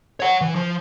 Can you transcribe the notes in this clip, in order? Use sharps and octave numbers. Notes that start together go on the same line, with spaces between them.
C#5 F#5
E3
F3